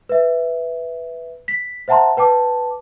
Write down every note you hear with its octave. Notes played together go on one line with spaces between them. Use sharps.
B4 E5
B6
C5 E5 F#5 A5 A#5 C6
B4 G5 A5 D6